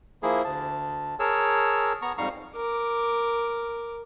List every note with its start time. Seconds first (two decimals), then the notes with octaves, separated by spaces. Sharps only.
0.23 F3 A#3 E4 G#4
0.44 D2 A5
1.20 G#4 A#4 C#5 A5 E6
2.02 B3 A#5 C#6
2.18 F2 G#2 G3 F5 A#5 C#6
2.56 A#4 D6